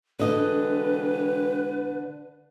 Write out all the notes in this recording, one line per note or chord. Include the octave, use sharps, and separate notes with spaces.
E1 D3 B4 D#5